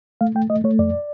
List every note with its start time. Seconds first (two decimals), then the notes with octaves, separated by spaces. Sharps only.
0.21 A3 F5
0.35 A3 G5
0.50 A3 D#5
0.64 A3 C#5
0.79 F2 D5